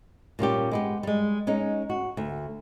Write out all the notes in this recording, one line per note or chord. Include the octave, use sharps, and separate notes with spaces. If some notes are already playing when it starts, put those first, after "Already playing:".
A#2 G3 C#4 G4
G#3 B3 G4
G3 G#3
G#3 C#4 D#4
F#4
D2